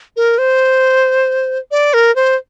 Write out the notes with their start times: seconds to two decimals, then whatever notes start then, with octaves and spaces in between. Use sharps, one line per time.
0.16 A#4
0.38 C5
1.71 D5
1.94 A#4
2.16 C5